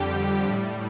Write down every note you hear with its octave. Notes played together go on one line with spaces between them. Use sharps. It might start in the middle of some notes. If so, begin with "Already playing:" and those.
Already playing: F2 D3 G3 G4
A2 G3